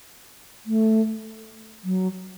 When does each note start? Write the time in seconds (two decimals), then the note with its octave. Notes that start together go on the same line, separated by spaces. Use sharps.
0.66 A3
1.84 F#3